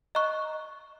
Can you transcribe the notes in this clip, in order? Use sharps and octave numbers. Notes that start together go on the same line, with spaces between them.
D#5 A#5 C#6 F#6